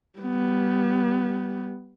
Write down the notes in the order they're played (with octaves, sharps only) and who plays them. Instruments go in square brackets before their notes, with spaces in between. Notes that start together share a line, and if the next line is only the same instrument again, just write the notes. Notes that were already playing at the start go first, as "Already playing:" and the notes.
[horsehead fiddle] G3 B3